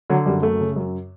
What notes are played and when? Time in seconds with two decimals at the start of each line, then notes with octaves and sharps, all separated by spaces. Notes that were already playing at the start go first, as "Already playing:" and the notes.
0.10 D3 F#3
0.26 F#2 G3
0.42 F#2 A3
0.60 C#3
0.76 F#2